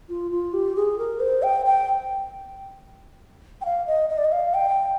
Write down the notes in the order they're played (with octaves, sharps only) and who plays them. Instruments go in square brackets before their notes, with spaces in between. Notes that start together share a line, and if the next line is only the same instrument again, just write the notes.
[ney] F4
F4
G4
G#4
A#4
C5
G5
G5
G5
F5
D#5
D#5
D5
D#5
F5
G5